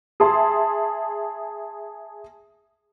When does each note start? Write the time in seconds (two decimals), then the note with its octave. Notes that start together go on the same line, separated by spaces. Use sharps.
0.20 G#4 E5 A5 C6